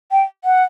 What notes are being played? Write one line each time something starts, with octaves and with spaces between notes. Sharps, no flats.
G5
F#5